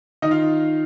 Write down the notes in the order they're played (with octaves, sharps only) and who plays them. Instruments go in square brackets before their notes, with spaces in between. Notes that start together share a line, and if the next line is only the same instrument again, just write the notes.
[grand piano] D#3 D#4 D#5
F4 F5